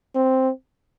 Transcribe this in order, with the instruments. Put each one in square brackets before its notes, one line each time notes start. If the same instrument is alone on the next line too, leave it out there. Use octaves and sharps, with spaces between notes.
[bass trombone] C4